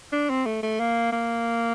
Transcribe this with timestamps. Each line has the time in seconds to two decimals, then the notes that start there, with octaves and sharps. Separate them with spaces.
0.13 D4
0.30 C4
0.46 A3
0.63 A3
0.80 A#3
1.12 A#3